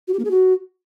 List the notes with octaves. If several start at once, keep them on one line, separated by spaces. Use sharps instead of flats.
F#4
G4
A#3
G#4
F#4